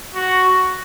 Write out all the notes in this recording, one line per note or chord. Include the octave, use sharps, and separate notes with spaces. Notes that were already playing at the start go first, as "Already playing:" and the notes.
F#4